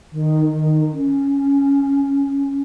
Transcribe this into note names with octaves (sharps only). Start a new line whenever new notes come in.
D#3
D#3
C#4